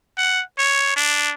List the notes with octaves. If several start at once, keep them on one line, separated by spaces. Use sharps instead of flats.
F#5
C#5
D4